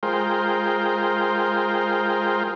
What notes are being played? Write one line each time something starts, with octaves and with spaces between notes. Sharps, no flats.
G#3 F4 A#4 C5 G5